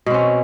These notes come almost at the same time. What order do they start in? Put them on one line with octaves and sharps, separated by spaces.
B2 C4 C#4